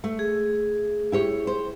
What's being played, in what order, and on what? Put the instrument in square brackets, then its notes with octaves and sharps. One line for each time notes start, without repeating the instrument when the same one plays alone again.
[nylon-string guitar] A3
[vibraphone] G#4
[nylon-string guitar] E4 G4 C#5
C5